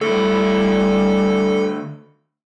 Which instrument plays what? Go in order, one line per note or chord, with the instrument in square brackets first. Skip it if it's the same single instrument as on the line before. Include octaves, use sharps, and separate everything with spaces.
[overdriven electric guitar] D2 E4 [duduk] G3 [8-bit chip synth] A4